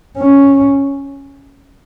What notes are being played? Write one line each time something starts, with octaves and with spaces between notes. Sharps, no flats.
C#4